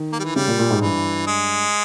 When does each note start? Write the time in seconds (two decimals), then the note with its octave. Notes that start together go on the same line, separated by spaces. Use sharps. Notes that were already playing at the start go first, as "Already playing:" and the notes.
Already playing: D#3
0.13 A#3
0.20 G3
0.24 E3
0.36 C#3 G3
0.48 A#2
0.59 A#2
0.71 G#2
0.82 G2 E3
1.28 G#3